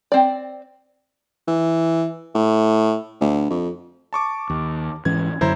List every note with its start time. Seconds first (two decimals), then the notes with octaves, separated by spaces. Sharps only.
0.12 C4 D5
1.47 E3
2.35 A2
3.21 D2
3.50 F2
4.13 A5 C#6 D6
4.50 D#2
5.05 G#2 E3 C#4 G#6
5.41 F#2 D3 F#3 E4 C5 A#5